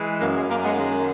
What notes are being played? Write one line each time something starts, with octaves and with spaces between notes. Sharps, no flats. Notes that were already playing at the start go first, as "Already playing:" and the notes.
Already playing: E3 G#3
F#2 A#3
G#3
F#2 A#3
G#3 B3
D#3 G#3